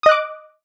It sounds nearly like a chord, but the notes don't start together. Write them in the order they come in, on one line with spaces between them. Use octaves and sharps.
D#6 D#5 F#6 D6